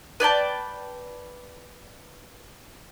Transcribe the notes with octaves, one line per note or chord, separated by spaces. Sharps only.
B4 D5 G5 A5